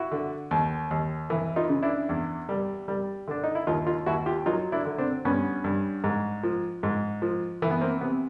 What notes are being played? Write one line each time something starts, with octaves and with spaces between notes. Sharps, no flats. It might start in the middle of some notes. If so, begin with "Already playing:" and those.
Already playing: E4 F#4
D3
D#2
D#2
E3
D#4 F4
C#3
D4 E4
E2
G3
G3
D3 D4
D#4
E4
D#2 D#4 F4
D#4 F4
D#2 E4 F#4
F4 G4
F#3 D#4 F4
D4 E4
D3
C4 D4
G2 B3 C#4
G2
G#2
F3
G#2
F3
E3
B3
A#3 C4
C3 B3